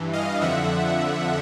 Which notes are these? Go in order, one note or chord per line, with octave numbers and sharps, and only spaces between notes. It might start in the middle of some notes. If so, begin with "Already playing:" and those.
Already playing: G2 E3
D#5 F5
F2 D3 F3 E5 F#5